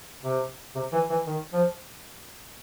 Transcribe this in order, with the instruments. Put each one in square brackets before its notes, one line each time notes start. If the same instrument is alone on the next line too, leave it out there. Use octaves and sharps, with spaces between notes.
[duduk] C3
C3
E3
E3
D#3
F3